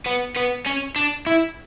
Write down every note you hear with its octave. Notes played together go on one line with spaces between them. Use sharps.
B3
B3
C#4
D4
E4